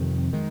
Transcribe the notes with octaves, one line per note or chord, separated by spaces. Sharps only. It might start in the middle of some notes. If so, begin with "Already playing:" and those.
Already playing: F2 C3 D#3 G3
D#3 G#3